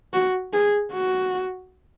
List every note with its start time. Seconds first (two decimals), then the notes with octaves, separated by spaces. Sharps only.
0.13 F#4
0.53 G#4
0.92 F#4